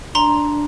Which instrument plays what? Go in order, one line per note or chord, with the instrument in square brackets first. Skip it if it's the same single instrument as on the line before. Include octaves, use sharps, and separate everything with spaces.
[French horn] D4 [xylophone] A#5 C6